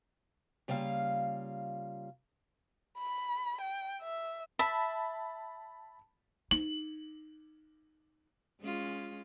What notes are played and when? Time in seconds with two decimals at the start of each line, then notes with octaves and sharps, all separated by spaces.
0.68 C#3 G3 A#3 F4 F5
2.98 B5
3.61 G5
4.02 E5
4.59 E5 A5 B5
6.51 D#4 F#7
8.60 G#3 C#4 F4